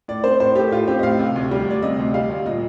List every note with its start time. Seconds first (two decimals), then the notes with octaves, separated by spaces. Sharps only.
0.08 A2 D5
0.24 C4 C5
0.40 A2 C5
0.55 A3 G4
0.71 A2 F4
0.88 C4 G4
0.99 D#5
1.03 A2 F5
1.19 C3
1.36 D2
1.51 G3
1.66 D2 D5
1.82 C3 D#5
1.99 D2
2.14 G3 F5
2.30 D2
2.45 A#2 D#5